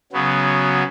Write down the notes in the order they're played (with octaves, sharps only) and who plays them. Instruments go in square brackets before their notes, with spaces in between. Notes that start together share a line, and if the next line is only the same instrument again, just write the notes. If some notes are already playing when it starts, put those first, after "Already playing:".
[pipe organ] C#3 F#3 B3